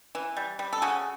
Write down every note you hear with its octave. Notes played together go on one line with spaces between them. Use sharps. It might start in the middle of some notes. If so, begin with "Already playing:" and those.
E3
G3
G3
A4
C#3 F#4 G#4